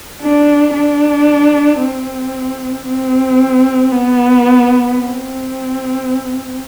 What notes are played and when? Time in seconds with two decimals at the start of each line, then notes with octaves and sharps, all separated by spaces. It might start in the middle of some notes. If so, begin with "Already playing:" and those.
0.22 D4
0.74 D4
1.80 C4
2.85 C4
3.91 B3
4.96 C4